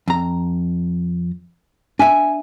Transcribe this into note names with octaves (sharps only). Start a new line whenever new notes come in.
F2 A#5
D4 E5 G#5